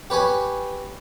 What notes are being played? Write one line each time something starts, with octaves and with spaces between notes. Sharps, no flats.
G4 B4 C#5 G#5